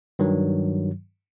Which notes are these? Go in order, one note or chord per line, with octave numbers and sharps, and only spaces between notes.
G2 D#3 F#3